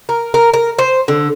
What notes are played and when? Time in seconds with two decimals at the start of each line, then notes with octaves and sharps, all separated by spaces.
0.09 A#4
0.34 A#4
0.54 A#4
0.79 C5
1.08 D3